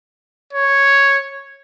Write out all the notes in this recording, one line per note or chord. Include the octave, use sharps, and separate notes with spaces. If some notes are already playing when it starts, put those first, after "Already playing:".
C#5